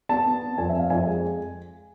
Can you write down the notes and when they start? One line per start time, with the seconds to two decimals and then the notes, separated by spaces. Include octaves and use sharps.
0.09 B3 A5
0.26 B3
0.42 B3
0.58 F2 G#5
0.69 C4 E5
0.79 F5
0.90 F2 G#5
1.07 G#3